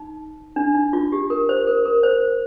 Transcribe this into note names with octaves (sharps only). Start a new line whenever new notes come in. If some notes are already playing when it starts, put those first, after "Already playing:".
Already playing: D#4
D4
D#4
F4
G4
A#4
C5
A#4
A#4
C5